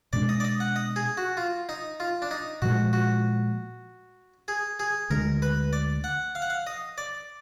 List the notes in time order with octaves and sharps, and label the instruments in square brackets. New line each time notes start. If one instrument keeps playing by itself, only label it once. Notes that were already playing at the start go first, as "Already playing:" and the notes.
[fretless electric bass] B2 G#3 D4 [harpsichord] D5
[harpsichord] D#5
D5
D#5
F#5
D#5
G#4
F#4
F4
D#4
F4
D4
D#4
[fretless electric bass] A#2 F3 G#3 [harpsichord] F#4
[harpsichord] F#4
G#4
G#4
[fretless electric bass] D2 D3 G#3 D4 [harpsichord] A#4
[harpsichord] B4
D5
F#5
F5
F#5
F5
D#5
D5